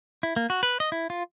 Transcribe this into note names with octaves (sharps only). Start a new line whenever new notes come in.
E4
A#3
F#4
B4
D#5
E4
F4